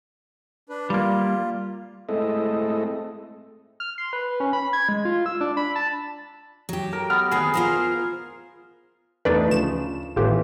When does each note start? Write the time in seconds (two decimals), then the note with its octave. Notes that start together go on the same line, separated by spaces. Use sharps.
0.69 D4 B4
0.90 G3 A#3 F4
2.09 G#3 A3 C4 E4 A4 D#5
3.80 F6
3.98 C6
4.13 B4
4.40 C#4
4.53 B5
4.73 G#6
4.89 G#3
5.05 F4
5.26 E6
5.41 D4
5.57 B5
5.76 A5
6.69 F#3 G4
6.93 A#4
7.10 B3 F6
7.31 D#2 A#3 B3 G#4
7.54 F4 A#4 C5
9.25 E2 A3 D4 D#4 B4
9.48 D2 C#3 F3 E7
10.16 G#1 A2 E3 B3 F4 G4